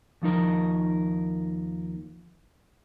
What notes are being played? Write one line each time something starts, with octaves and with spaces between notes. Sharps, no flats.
D#2 F3 D#4 A#4